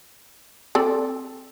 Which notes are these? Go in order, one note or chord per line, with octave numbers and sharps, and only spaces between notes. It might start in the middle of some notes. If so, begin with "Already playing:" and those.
C4 A4 D5